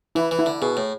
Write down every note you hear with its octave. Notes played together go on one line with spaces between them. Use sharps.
E3 E4
E3
E4
D3
B2 G#4
A2